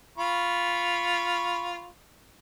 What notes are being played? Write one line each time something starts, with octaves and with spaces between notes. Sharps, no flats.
F4 B5 C#6